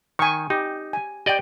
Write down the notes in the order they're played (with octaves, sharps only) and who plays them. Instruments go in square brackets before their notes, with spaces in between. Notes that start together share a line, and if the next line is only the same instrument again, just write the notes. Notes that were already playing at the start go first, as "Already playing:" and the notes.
[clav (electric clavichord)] D#3 [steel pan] G#5 C#6
[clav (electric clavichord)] D#4 [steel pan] G4
[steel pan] G#5
[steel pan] G4 G5 [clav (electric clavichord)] D5 D#5